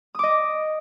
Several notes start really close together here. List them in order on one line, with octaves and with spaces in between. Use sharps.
D#6 D6 D#5